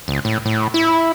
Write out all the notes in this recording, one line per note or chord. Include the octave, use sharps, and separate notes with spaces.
C#2
A2
A2
E4